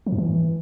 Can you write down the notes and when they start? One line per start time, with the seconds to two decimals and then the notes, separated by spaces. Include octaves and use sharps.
0.06 F3
0.12 G2
0.18 E3